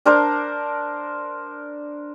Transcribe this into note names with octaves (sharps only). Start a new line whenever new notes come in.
D4 A#4 C5 D5